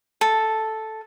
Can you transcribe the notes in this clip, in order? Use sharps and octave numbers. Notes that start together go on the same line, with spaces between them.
A4